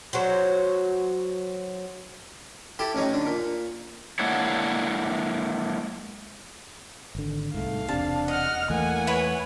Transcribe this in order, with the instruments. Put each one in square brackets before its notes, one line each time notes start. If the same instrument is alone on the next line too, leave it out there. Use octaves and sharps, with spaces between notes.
[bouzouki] F#3 F#4 C5
[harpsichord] E4 G4 A4
A1 C#4 D#4
D3
A#2
[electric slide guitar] G#3 A#3 D4 E4 C#5 F#5
[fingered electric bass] G#1 D3
[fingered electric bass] C2 G#2 [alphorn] A3 [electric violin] F5
[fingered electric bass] E1 C3 [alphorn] D4 [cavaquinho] A5
[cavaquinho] D#5 [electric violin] F#5 F6
[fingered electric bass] E2 E3 A3 [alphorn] A#3 [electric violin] F#5 G#5
[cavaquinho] E4 B4 C#5